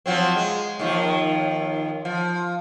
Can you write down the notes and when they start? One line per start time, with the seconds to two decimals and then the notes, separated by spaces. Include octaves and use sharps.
0.06 F3 F#3 C4
0.36 G#3
0.79 D#2 D#3 F3
2.05 F3